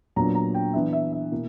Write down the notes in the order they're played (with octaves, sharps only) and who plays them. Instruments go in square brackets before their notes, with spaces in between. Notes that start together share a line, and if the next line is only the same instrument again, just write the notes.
[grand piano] A#2 F#3 B3 D4 A#5
A#5
G5
E3 B3 D4 E5
E5
E5
B2 A#3 E4